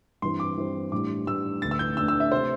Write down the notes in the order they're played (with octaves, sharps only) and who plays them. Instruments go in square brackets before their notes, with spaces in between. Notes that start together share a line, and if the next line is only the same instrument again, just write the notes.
[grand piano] G2 E3 C4 [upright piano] C6
[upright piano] D6
[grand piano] G2 E3 C4
[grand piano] A2 G3 D4 [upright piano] D6
[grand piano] A2 G3 D4 [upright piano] E6
[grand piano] D2 D3 A3 D4 [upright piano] A6
[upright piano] E6
G6
[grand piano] D2 D3 A3 D4 [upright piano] E6
[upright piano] E6
E5
[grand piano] C3 A3 [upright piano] C5